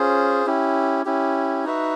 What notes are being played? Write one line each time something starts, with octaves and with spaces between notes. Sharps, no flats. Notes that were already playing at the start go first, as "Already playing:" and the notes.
Already playing: C#4 F4 G#4 C5
C#4 E4 G4
C#4 E4 G4
D#4 F#4 B4 E5